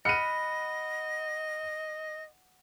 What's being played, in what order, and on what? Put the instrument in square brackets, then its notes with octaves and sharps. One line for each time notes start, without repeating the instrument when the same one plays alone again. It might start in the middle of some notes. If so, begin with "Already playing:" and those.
[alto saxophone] D#5 [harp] F#5 B5 F6 [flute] A#6 [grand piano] C#7 D#7